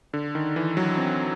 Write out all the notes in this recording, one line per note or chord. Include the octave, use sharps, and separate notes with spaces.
D3
D#3
E3
F#3
C4